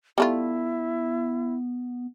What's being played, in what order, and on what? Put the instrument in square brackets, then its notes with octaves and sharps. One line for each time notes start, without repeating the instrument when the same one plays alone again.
[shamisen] G3 A3 F4 [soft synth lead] B3 [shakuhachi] E4